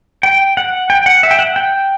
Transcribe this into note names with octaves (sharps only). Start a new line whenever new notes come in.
G5
F#5
G5
F#5
E5
G5
F#5
G5